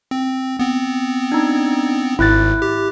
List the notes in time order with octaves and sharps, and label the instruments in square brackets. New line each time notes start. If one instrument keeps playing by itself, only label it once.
[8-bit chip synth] C4
B3 C4
[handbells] D4 D#4
[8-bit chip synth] G#1 G#2 [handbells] E4 F#6 A6
[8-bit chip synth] G4